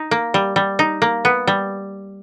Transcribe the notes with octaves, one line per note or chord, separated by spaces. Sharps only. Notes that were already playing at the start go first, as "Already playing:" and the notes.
Already playing: D#4
A#3
G3
G3
D#4
A#3
B3
G3